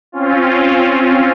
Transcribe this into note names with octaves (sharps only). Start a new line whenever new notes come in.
C4 C#4 F4